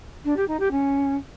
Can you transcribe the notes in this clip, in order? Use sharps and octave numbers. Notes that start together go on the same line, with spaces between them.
D4
G4
D#4
G4
C#4